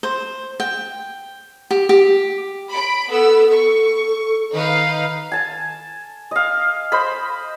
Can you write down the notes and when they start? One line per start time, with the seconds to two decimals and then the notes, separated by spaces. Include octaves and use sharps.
0.03 C5
0.60 G5
1.71 G4
1.89 G4
2.70 B5 D7
3.11 B3 A4 E6
3.50 A4 C#6
4.53 D#3 D#4 B4 F5
5.32 G#5 A5
6.31 D#5 F5
6.92 C5 D#5 B5